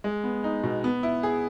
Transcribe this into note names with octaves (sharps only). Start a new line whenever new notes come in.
G#3
B3
D#4
B2
B3
E4
G#4